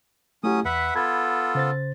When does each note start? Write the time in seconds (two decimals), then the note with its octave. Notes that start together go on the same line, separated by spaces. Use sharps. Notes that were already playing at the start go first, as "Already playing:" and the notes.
0.44 F#3 A3 C#4 E4 G4 D#6
0.65 E2 B4 E5 F#5
0.95 B3 F4 A4 B5 G#6
1.55 C#3 C5 A6